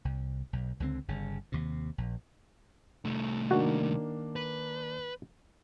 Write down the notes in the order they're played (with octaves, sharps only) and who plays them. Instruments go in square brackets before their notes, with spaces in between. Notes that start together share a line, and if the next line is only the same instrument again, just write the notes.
[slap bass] C2
B1
C#2 D3 G#3 C4
G1 C#3
D#2 C3
A#1
[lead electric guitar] C2 A3
[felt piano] D#3 A#3 D4 [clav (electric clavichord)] F#4
[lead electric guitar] B4